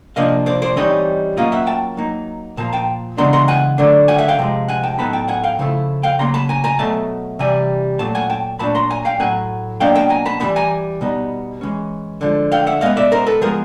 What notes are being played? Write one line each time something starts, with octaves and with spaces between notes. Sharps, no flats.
C3 F3 A#3 D4 D#5 F5
C5 D5
C5 D5
E3 G3 C4 D#4 C#5 D#5
F#3 A#3 C#4 F4 D#5 F5
E5 F#5
G5 A5
F#3 A#3 D#4
A#2 F3 A#3 F4 A5
G5 A5
C#3 E3 G#3 B3 D4 A#5 C6
A#5 C6
F#5 G#5
D3 F#3 A3 D4
F#5 G#5
E5 F#5
F5 G5
C3 F3 G#3
F#5 G#5
G5 A5
A2 F#3 B3 D#4 A5 B5
G5 A5
F#5 G#5
F5 G5
C#3 F3 A3 C4 E4
F5 G5
C#3 F#3 A#3 A#5 C6
A5 B5
G#5 A#5
G#5 A#5
B2 F#3 A3 A5
C3 E3 G3 G#5
A#2 F#3 A3 A5
F#5 G#5
G5 A5
A#2 F#3 A3 D4 A5 B5
A#5 C6
G#5 A#5
F5 G5
A2 F#3 A#3 F#5 G#5
B2 F#3 A#3 D4 F5 G5
G5 A5
G#5 A#5
A5 B5
E3 G3 B3 A5 B5
G#5 A#5
B2 G3 B3 D#4
E3 G#3 C#4
D3 F3 G#3
F5 G5
E5 F#5
B2 G#3 B3 D#5 F5
D5 E5
A#4 C5
A4 B4
F3 G#3 B3 G#4 A#4